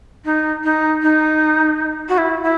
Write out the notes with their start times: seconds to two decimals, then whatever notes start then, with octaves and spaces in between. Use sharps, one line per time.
0.25 D#4
0.64 D#4
1.02 D#4
2.09 F#4
2.18 E4
2.43 E4